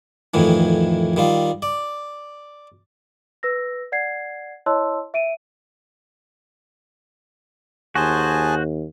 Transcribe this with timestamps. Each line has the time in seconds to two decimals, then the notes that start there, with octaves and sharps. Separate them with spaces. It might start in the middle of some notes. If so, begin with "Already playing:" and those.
0.34 F2 A2 D#3 E3
1.16 D#3 G3 F4
1.62 D5
3.43 B4 E6 A#6
3.92 D5 F#5 G#6 C7
4.66 E4 C#5 D#5 A5 C6 E6
5.14 E5 D7 D#7
7.95 D#2 F#4 G#4 C5 G#5 A5